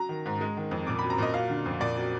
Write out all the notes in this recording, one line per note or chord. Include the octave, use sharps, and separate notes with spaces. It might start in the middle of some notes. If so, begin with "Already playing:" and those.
Already playing: F#3 A#5
D#3
G#2
G#3
D#3
F2
A#2 D6
F#3 B5
A#5
A#2 D#5
F#3 F5
D3
F2
A#2 D5
F#3